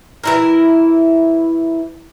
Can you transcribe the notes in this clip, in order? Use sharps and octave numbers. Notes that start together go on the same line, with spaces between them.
E3 E4 A#4